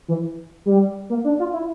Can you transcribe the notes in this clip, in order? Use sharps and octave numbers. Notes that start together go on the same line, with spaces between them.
E3
G3
A#3
D4
F4
E4